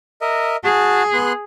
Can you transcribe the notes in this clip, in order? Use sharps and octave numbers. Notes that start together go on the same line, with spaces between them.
A#4 D#5 E5
F#4 G#4 A5
B3 C6 F#6